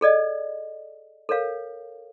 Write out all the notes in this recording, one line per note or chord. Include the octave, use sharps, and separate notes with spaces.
G#4 A4 D5 D#5
A4 A#4 C#5 F5